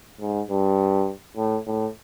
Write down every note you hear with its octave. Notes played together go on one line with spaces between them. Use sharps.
G#2
G2
A2
A2